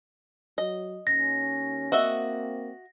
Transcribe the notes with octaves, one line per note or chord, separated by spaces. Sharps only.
F#3 D#5
D#2 C#4 A#6
A#3 C4 F#4 D#5 E5